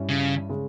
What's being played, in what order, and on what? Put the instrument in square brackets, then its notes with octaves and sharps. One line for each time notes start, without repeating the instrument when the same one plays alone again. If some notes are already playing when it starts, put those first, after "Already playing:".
Already playing: [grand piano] G2 G3 C#4 E4
[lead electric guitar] C#3
[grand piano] C#3 G#3